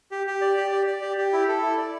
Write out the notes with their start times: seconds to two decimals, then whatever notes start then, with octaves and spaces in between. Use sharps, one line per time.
0.11 G4
0.27 G4
0.41 D5
0.57 G4
0.72 D5
0.87 D5
1.02 G4
1.18 G4
1.33 E4
1.48 A4
1.62 E4
1.78 D5